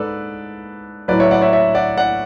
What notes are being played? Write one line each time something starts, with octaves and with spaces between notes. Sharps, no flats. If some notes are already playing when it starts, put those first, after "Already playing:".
Already playing: G#2 A4 B4 D5
A2 F#3 B4 D5
C#5 E5
D5 F#5
C#5 E5
C#5 E5
D5 F#5
D5 F#5